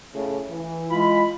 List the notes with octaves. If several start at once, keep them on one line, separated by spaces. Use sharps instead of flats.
A2 C#3
E3
G#3 F4 B5